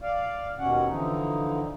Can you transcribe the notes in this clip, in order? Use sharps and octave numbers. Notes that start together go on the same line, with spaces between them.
D5 F5
D#2 B2 C#4 F#5
D3 E3 F3 D#4